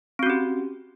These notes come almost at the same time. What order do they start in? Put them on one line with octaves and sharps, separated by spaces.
C4 F#4 C#4 G4